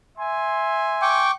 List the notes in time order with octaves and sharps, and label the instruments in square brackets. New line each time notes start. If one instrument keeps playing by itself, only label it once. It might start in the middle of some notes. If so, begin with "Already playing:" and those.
[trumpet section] E5 G#5 C6
[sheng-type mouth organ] G5 C#6 D6